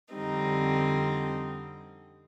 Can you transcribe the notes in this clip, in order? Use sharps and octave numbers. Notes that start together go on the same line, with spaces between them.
F2 D3 G3 C4 D#4